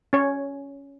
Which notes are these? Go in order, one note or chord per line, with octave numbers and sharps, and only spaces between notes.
C#4 C#5